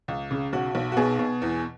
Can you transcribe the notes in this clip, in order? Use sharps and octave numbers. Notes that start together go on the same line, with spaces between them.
C#2
C#3
B1 F#4
B1
F#4
B2 G#4
B2
E2